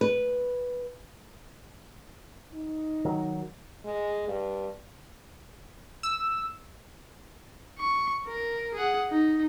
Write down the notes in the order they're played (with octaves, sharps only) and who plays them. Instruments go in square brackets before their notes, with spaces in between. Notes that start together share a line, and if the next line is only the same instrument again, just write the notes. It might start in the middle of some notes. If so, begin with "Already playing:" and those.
[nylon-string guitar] B4
[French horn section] D#4
[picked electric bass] D#3 F#3
[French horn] G#3
G2
[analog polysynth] E6
[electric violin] C#6
A#4
G#4 F#5
D#4